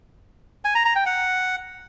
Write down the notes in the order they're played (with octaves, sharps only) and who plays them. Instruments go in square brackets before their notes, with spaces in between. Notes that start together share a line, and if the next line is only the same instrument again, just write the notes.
[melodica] G#5
A#5
A#5
G5
F#5